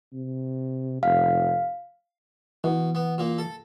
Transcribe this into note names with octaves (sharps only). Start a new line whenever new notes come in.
C3
F1 F5
B2 E3
B3
A#2 A#3
A4